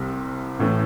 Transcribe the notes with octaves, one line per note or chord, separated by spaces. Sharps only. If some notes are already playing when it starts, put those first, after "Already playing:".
Already playing: C2 C3 G3
A1 A2 E3 A3